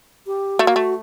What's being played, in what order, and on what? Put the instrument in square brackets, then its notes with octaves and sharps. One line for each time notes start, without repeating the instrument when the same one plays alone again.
[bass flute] G4
[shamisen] A3 [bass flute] F#4
[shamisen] A#3
A3